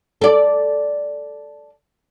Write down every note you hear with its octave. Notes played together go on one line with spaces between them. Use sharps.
A4 D5